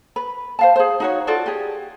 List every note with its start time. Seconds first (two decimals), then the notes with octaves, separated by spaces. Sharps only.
0.16 B4
0.59 C5 F5 A5
0.76 G#4 C5
1.00 D#4 F#4 C#5
1.27 F4 F#4 A4 D5
1.46 G4 G#4